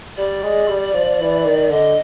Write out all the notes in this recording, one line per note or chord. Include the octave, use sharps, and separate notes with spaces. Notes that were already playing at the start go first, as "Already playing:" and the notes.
G3 D5
G#3
G3
F3
E3
D#3
D3 D#5